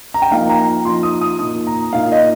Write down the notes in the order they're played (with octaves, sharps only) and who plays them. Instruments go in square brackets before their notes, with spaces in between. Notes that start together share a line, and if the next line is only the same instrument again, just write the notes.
[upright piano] A#5
G5
F3 A#3 D#4 F5
A#5
F3 A#3 D#4 C6
D#6
D#6
A#2 A#3 D#4 D#6
A#5
A#2 A#3 D#4 F5
D#5